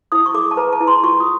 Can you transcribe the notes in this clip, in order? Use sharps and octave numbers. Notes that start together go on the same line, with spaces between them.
E4 D#6
C#6
G#4 D6
A5
B4 A#5
A5
E4
C6
F4 C#6
D#6